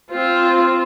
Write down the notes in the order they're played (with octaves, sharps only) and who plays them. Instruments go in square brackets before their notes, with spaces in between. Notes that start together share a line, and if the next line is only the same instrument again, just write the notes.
[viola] C4 F4